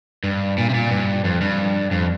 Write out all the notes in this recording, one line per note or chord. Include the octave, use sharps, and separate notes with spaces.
G2
A#2
C3
A#2
G2
F2
G2
F2